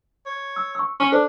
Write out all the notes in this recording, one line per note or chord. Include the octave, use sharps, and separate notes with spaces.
C#5
E6
C#6 E6
C#4 C#6
D4 A4 C5